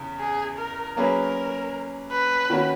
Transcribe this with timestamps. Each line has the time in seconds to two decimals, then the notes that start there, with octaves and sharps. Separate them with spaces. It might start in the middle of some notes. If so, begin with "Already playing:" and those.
Already playing: E2 C#3
0.20 G#4
0.57 A#4
0.96 F#3 A#3 C#4 G#4 A#4 B4
2.11 B4
2.50 D#3 A#3 C#4 F#4